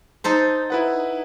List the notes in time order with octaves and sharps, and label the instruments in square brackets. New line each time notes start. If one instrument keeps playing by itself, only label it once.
[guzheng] D#4 A4 C5
[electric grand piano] E4 B4 F#5